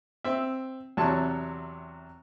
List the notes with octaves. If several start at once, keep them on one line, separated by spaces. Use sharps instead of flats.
C4 E5
E2 C3 F#3 C#5 A5